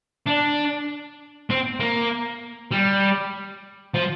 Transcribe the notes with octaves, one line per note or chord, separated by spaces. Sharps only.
D4
C4
A#3
G3
F3